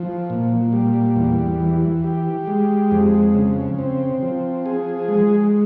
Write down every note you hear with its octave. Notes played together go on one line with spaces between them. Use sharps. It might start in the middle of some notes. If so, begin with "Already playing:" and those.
Already playing: F3
A#2
G3
E2
E3
G4
G#3
F2
C#3
C4
F3
G#4
G#3